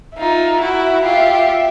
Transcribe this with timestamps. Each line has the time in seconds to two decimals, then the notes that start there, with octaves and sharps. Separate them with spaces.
0.18 D#4 F4 E5
0.60 E4 F#4
1.03 F4 G4